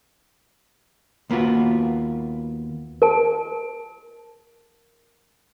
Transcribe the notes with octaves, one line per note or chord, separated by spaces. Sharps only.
D#2 A#3 B3 F4 F#4
A#4 A5